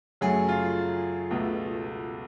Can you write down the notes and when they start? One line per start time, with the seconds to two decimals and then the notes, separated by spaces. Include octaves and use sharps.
0.21 F#2 C#3 F#3 A3 G#4
0.48 F4
1.31 C#2 B2 A3